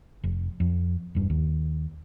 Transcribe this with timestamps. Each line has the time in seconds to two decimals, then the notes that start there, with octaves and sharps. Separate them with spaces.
0.24 F1
0.60 F2
1.15 E1 G2
1.30 D#2